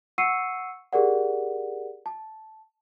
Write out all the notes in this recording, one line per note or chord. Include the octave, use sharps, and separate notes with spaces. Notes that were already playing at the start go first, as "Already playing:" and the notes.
F#5 C#6 E6 C7 C#7 D#7
G4 G#4 A#4 D5 F#5
A5